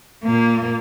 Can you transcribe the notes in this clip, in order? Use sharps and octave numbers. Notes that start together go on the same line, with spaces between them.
A#2 A#3